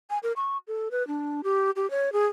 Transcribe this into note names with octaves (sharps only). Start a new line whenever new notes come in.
G#5
A#4
C#6
A4
B4
D4
G4
G4
C#5
G#4